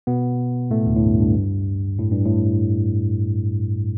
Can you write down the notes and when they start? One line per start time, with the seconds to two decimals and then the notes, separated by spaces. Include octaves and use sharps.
0.07 B2 B3
0.71 A2 A3
0.86 D2 D3
0.96 A2
1.03 G2
1.19 G2
1.98 A2
2.11 G2
2.25 A2